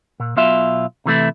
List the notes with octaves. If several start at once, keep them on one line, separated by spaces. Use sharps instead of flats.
A#2
B1 B2 F4 E5
C3 E3 A3 E4